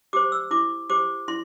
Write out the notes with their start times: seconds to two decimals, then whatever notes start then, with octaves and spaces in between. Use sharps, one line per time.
0.13 G4 C5 D6
0.32 E6
0.51 E4 D6
0.90 G4 C5 D6
1.28 E4 C6